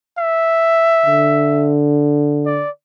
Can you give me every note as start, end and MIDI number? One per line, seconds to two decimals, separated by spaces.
0.18 1.76 76
1.05 2.63 50
2.46 2.70 74